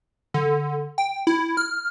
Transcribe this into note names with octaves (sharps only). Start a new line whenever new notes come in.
D3
G5
E4
F6